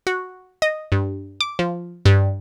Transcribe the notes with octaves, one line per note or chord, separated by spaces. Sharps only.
F#4
D#5
G2
D6
F3
G2